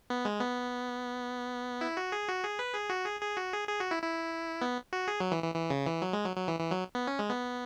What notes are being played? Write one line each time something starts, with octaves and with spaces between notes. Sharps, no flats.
B3
G#3
B3
E4
F#4
G#4
F#4
G#4
B4
G#4
F#4
G#4
G#4
F#4
G#4
G#4
F#4
E4
E4
B3
F#4
G#4
F#3
E3
E3
E3
C#3
E3
F#3
G#3
F#3
F#3
E3
E3
F#3
B3
C#4
G#3
B3